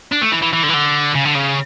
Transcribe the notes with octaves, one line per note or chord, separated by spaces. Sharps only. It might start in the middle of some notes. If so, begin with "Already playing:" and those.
D4
A3
E3
E3
E3
D3
E3
D3
C#3
D3
C#3